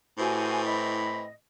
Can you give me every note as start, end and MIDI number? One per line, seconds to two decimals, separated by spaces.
0.18 1.32 45
0.18 1.23 52
0.18 1.23 60
0.18 0.61 66
0.18 0.61 67
0.18 0.63 72
0.18 0.61 80
0.65 1.31 75
0.65 1.22 83